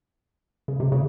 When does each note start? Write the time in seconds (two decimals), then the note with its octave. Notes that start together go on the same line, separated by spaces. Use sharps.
0.68 C#3
0.80 C3
0.92 C#3